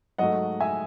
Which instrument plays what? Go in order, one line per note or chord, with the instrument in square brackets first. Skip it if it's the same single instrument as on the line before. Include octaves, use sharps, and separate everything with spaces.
[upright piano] G#2 F#3 A3 D#5 F#5
E5 G#5